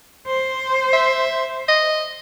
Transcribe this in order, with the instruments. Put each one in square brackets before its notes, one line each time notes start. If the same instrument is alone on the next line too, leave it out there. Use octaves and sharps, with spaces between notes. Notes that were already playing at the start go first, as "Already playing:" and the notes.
[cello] C5
[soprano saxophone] E5
D#5